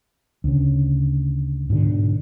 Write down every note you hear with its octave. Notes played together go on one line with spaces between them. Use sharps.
D2 C#3
G#2 B2 D3